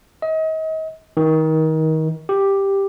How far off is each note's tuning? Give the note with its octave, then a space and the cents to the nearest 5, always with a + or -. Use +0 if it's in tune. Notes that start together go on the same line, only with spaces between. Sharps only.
D#5 +35
D#3 +25
G4 +5